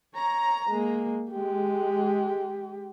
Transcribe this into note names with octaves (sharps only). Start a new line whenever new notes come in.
C#5 A#5
G#3 A#3
G#3 G4